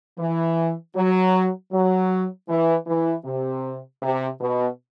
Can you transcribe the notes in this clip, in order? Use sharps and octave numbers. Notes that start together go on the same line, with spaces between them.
E3
F#3
F#3
E3
E3
C3
C3
B2